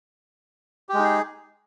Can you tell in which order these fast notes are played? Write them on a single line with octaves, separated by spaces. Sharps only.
G4 G#3 D#4 G#4